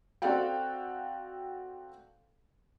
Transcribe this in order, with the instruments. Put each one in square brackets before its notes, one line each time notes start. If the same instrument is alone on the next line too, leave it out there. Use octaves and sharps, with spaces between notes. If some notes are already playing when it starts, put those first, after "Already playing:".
[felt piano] C4 F#4 A4 D5 F5 G5